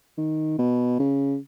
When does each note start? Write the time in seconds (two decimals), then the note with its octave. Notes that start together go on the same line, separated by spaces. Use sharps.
0.18 D#3
0.59 B2
0.99 C#3